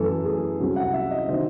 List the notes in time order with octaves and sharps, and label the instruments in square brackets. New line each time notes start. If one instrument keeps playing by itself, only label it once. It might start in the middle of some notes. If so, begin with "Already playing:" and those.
Already playing: [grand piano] F#2 E3 A3 A4
G#4
C2 C3 F#3 C#4
F#5
E5
D#5
C3 D#3 F#3 C4 D#4 C5